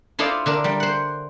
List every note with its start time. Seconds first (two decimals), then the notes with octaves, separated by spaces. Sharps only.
0.19 E4 F4 A4 C5 D5 D#5
0.46 D3 D4 A#4
0.64 G3 G5
0.80 C5 F#5